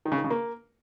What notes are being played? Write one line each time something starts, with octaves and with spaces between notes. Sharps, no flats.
D#3
C#3
D#3
C#3
A#3